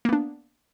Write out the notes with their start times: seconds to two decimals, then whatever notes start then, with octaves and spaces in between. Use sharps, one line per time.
0.05 A#3
0.09 B3
0.13 D4